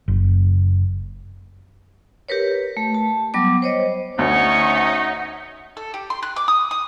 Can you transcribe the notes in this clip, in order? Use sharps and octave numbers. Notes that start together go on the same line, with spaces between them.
F#1
G4 A#4 B4 C#5
A3
A5
F#3 G3 B3 D6
C5 C#5 D#5
D2 C#4 D#4 C#5 E5 F#5 C#6
A4
G4
C6
F#6
D6
D#6
D#6